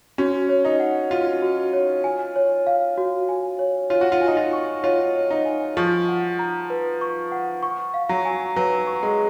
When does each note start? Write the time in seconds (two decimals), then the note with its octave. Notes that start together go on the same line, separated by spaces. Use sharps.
0.18 C#4 F#4
0.49 C#5
0.65 D#4
0.80 F#5
1.11 F4 F#4
1.42 F#4
1.73 C#5
2.04 G#5
2.36 C#5
2.67 F5
2.97 F#4
3.29 G#5
3.59 C#5
3.90 F4 C#5
4.01 F#4
4.12 F4
4.21 G#5
4.27 D#4
4.37 F4
4.53 C#6
4.84 F4 C#5
5.15 C#5
5.30 D#4
5.45 G#5
5.77 F3 C#6
6.08 F#5
6.39 A#5
6.70 B4
7.01 C#6
7.32 F#5
7.63 C#6
7.94 F5
8.09 F#3
8.25 G#5
8.56 F#3 B4
8.87 C#6
9.03 G#3